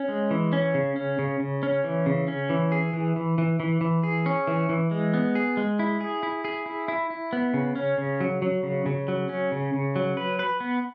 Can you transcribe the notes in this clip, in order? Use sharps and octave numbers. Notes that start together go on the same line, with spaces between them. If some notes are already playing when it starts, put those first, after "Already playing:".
Already playing: C#4
G#3
E3
C#4
C#3
C#4
C#3
C#3
C#4
E3
C#3
C#4
E3
G#4
E3
E3
E3
E3
E3
G#4
C#4
E3
E3
G#3
B3
G#4
G#3
E4
G#4
E4
G#4
E4
E4
E4
B3
C#3
C#4
C#3
F#3
F#3
C#3
C#3
F#3
C#4
C#3
C#3
F#3
B4
B4
B3